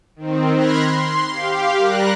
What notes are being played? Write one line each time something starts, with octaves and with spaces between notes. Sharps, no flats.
D#3 C4
B5 C6 F6 F#6 G#6 A#6
C6
G4 F5
G3 A#4 F#6 A#6